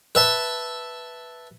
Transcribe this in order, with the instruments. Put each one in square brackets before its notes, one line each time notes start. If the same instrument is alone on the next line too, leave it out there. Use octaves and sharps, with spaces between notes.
[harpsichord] B4 E5 A5